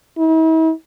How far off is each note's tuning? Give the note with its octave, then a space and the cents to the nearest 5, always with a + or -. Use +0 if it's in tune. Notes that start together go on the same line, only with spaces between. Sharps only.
E4 -45